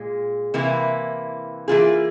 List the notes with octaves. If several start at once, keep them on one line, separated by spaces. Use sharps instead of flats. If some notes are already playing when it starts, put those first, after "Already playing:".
Already playing: A#2 G#3 G#4
C3 E3 A#3 E4
E3 A#3 F4 G#4